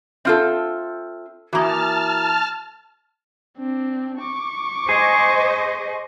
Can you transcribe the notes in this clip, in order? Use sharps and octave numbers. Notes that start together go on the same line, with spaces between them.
C4 F4 A4 E5 F6
E3 A#3 F#4 A5 A#5 D#6 F6
C4 D4
C#6 D6
G#4 C5 D#5